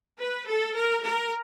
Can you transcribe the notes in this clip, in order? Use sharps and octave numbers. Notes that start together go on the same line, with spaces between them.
B4
A4
A#4
A#4